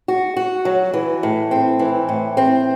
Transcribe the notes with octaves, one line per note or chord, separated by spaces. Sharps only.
F#4
F#4
F#3
E3
A2
C4
E3
A2
C4